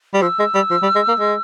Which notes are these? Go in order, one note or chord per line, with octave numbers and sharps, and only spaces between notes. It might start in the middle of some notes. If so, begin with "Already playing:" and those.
G3
F3 E6
G#3
G3
F3
G3
G#3
A#3
G#3